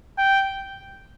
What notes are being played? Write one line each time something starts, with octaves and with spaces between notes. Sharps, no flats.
G5